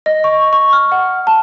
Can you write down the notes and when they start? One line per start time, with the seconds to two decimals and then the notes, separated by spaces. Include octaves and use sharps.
0.06 D#5
0.24 C#6
0.53 C#6
0.73 F6
0.92 F#5
1.27 A5